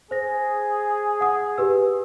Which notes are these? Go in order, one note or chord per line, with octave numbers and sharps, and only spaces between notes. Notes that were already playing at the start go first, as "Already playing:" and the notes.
G#4 C5 A#6
F#5 D#6
G4 B4 E6